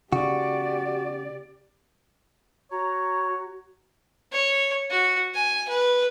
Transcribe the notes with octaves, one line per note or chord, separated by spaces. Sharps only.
C#3 F#4 G4 D5
F#4 C#5 A#5
C#5
F#4
G#5
B4